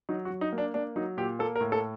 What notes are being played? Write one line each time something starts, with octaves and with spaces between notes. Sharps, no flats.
F#3 D#4
F#4
F#3
D#4
A#3
D4
A#3 D4
F#3 D#4
A#2 G4
A#3 A4
A#4
A2
A4